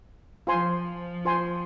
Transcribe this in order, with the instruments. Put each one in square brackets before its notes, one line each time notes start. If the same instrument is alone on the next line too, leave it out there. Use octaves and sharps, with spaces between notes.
[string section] F3 [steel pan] F4 C5 G#5 C6
[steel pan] F4 C5 G#5 C6